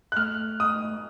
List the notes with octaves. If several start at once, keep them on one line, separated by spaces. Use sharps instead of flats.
F#6
A3 F6
D#6